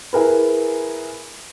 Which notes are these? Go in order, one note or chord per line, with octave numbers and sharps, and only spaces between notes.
E4 G#4 A#4 B4